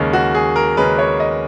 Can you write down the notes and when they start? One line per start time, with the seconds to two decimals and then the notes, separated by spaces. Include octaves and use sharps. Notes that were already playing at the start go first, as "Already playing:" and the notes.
Already playing: D#2 C#3 G#3 C#4
0.13 F#4
0.35 G#4
0.56 A#4
0.77 D#2 C#3 G#3 C#4 B4
0.99 C#5
1.20 D#5